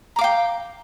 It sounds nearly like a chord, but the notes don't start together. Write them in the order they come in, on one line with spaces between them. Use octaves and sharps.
A#5 D6 F5 G5